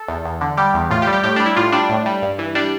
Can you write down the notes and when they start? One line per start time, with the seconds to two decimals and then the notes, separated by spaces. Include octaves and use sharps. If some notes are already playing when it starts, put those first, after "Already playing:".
Already playing: A4
0.08 E2
0.25 E2
0.41 D3
0.57 G3 G4
0.74 E2
0.90 A2 F4
1.02 G4
1.07 G3
1.13 G4
1.24 A2 G4
1.36 G3 D4
1.46 E4
1.56 A2 F4
1.72 G3 D4
1.89 A2
2.06 G3
2.22 G2
2.39 E3
2.55 G3 D4